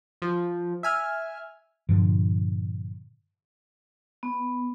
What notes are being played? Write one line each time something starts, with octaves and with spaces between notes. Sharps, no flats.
F3
E5 G#5 F6
G2 A#2 D3 F3
B3